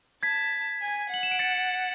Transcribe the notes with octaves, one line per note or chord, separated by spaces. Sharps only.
A5 G#6 B6
G#5
F#5 F#7
E7
D7
A6 C#7